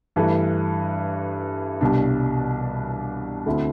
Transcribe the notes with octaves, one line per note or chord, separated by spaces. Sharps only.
G2 E3 A3
C2 B2 G3 D4
D2 D3 A3 C4 E4